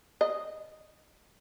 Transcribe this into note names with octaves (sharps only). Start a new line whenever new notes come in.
D#5